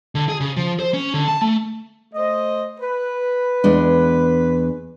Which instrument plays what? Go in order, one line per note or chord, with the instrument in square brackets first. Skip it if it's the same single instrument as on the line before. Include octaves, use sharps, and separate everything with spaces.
[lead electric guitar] D3
G#4
C#3
F3
C5
C#4
D3
A5
A3
[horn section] A3 C5 D#5
B4
[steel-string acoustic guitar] E2 G#3 D4